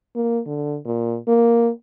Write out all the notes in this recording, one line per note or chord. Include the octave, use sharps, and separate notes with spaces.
A#3
D3
A#2
A#3